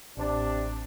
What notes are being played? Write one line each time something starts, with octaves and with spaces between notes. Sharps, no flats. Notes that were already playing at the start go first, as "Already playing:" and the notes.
A1 C3 D4 C5 A5